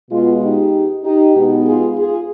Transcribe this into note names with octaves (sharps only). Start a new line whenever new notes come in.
B2 G#3 B3 F4
D#4 G4
D#4 G4
B2 G#3 B3 D#4
F4 G#4
F4 G#4